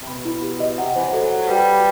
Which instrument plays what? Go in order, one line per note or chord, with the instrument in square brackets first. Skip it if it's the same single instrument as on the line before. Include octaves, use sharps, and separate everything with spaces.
[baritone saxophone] C3
[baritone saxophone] B2 [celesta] B5
[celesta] E4
G4
D#5
[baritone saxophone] C3 [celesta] F#5
[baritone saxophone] E3 [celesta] C5
[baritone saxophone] F#3
[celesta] A4
F#5
[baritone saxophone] F#3
[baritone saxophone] G3 [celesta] B4
[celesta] B4